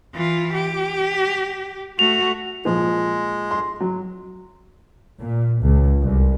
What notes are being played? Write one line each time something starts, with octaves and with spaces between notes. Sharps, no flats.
E3 F4
G4
A3 F#4 F7
A#2 F3 G#3
C6
F#3
A#2
C#2
C2